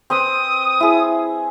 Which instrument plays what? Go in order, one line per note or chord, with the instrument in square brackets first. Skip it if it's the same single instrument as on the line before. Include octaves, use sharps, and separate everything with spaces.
[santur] C4 B4 E6 [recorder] D#6
[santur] E4 G#4